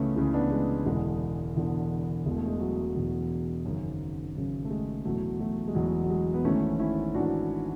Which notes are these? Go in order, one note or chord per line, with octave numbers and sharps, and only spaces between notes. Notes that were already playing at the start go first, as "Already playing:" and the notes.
Already playing: C#2 C#3 E3 G#3 A3 B3 C#4
C#2 C#3 E3
B3 D4
G#3 B3
E1 E2 D3 G#3
E1 E2 D3
E1 E2 B2 G#3
A3
G#3
F#3
E1 E2 B2
G#1 F#2 C#3
G#1 F#2 C#3
A3
G#3
E1 E2 B2 F#3 A3
F#3 A3
G#3
E1 E2 B2 F#3
F#3
G#3
B3
G#1 G#2 E3 A3 C#4
C#4 E4
G#1 G#2 E3 D4 F#4